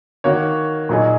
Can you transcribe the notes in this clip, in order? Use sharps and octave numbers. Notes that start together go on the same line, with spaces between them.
D#3 A#3 F#4 C#5
A#2 F#3 D#4 G#4